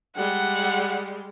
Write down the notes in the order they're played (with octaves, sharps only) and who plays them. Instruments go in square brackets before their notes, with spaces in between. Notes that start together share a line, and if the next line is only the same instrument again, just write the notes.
[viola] G3 G#3 [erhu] F#5